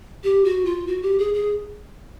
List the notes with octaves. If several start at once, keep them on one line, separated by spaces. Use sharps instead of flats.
G4
F#4
F4
F#4
G4
G#4
G#4